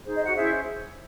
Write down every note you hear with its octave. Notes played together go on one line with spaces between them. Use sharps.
D#4 G#4 C5
D#5
F#4 F#5
C#4 E4 G#4 C5 E5